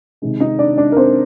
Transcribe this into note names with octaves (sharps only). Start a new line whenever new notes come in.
C3 D#3 G#3 D#4
D#4 D#5
D4 D5
D4 D5
A#4
C4 C5